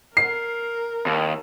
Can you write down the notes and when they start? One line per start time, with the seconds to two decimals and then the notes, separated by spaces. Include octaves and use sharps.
0.17 A#4 C7
1.06 D#2